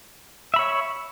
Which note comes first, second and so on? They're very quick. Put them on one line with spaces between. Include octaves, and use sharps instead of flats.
E5 B5 C#5